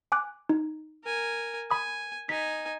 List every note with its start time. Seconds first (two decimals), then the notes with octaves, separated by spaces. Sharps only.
0.12 G#5 D6 F#6
0.49 D#4
1.04 A#4 G#5
1.71 G#5 B5 D#6
2.29 D#4 G#5 B6